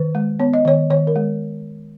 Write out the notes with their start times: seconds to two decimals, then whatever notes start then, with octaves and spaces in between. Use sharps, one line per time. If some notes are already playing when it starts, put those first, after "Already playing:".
Already playing: D#3 B4
0.15 G#3
0.40 B3 C#5
0.54 D#5
0.65 D#3 C#5
0.90 D#3 C#5
1.07 A#4
1.16 G#3